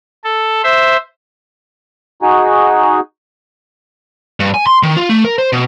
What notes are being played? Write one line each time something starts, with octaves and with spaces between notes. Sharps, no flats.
A4
C5 E5
D#4 F#4 G#4
G2
G#5
C6
D#3
F4
A3
A#4
C5
B2